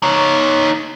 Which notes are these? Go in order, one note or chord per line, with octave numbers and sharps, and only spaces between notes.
D#4 C#5